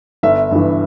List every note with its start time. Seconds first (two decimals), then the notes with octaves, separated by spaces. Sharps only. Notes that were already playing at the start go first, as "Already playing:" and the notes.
0.23 G1 E5
0.51 G2 E3